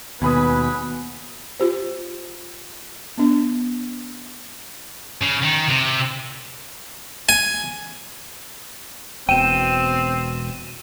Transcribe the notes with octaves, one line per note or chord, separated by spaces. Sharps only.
D#2 B2 B3 B4 G#5 B5 D#6
F4 G4 C5
B3 D4
C#3
D#3
C3
G#5
E1 B2 C4 G5 D#7 E7